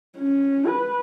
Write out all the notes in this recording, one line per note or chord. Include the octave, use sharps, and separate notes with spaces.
C#4
B4